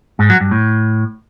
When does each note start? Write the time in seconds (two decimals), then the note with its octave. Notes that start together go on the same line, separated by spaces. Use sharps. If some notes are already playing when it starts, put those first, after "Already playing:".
0.19 G#2
0.30 F#3
0.41 G2
0.51 A2